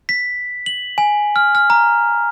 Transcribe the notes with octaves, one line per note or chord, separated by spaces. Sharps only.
B6
F#7
G#5
F6
F6
A#5